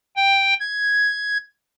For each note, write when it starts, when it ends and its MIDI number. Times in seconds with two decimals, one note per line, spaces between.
0.16 0.54 79
0.60 1.38 92